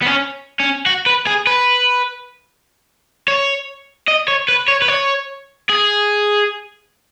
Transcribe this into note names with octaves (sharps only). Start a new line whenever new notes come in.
B3
C#4
C#4
F#4
B4
G#4
B4
C#5
D#5
C#5
B4
C#5
B4
C#5
G#4